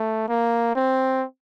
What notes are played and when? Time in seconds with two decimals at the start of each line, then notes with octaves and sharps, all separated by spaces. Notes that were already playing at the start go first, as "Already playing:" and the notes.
Already playing: A3
0.29 A#3
0.75 C4